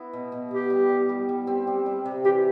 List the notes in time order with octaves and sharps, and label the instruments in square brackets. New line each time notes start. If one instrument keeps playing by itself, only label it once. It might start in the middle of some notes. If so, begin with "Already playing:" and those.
Already playing: [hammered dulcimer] B3 E4 F#4
B2
B2
[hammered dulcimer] B3 [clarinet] G4
[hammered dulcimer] G3
G3
G3
G3
C4
G3
G3
C3
[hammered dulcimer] E3 [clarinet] G4